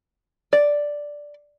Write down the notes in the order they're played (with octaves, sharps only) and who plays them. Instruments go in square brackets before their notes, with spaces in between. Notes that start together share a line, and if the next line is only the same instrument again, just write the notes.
[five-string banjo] D5